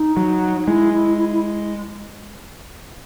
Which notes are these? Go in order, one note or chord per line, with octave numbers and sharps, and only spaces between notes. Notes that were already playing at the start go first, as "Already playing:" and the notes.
Already playing: D#4
F#3
G#3 E4
E4
E4
E4